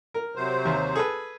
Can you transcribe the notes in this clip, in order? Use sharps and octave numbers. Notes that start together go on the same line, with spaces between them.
A#4
C3 F#3 C5
D#2
G#4 A4 B4